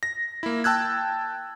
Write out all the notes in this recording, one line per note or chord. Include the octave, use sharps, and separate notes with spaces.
A#6
A#3 E4
G5 A5 E6 F#6 G#6